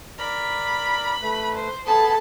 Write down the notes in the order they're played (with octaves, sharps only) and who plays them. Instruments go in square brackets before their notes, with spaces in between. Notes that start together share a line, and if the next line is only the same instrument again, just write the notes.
[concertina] A#4 D5 A#5 [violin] B5
[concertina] A3 B4
[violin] C5
[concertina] B3 G#4 B5 [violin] A4 A5